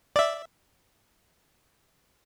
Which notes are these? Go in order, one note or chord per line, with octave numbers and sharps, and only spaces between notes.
D5 E5